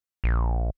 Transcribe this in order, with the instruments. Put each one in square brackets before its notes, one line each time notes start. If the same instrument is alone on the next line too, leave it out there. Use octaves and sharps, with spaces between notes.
[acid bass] A#1